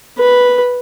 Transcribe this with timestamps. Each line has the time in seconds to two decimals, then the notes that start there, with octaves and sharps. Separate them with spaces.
0.18 B4